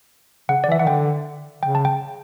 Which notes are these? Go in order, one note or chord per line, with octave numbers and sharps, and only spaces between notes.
C#3 F#5
D5
E3
E5
E3 F#5
D3 G5
C#3 G5
A5
G5